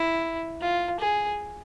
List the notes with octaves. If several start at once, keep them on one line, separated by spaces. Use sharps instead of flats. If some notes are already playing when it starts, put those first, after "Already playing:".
Already playing: E4
F4
G#4